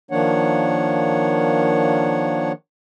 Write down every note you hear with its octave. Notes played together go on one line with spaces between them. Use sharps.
D#3 F3 A#3 D4 C#5 F#5